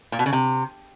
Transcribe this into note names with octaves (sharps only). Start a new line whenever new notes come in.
A#2
B2
C#3
C3